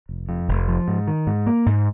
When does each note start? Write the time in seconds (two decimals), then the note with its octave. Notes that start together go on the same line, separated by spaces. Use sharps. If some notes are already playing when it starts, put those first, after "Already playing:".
0.09 F1
0.29 F2
0.48 F1
0.68 F3
0.88 G#2
1.07 D#3
1.27 G#2
1.47 A#3
1.66 G#2